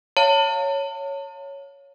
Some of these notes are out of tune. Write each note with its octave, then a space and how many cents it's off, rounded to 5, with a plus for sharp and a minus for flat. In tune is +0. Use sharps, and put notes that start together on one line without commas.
C#5 +0 F5 +0 A5 +40